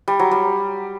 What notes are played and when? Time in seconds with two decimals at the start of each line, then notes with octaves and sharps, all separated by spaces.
0.08 G3
0.19 F#3
0.31 G3